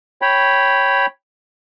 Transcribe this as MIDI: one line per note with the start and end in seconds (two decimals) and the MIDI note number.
0.22 1.06 73
0.22 1.06 79
0.22 1.06 83